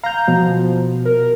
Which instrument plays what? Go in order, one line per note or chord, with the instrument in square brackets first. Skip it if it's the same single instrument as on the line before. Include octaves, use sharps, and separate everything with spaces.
[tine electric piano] F5 G6 [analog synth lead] A#5
[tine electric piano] B2 [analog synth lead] F3
[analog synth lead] A#4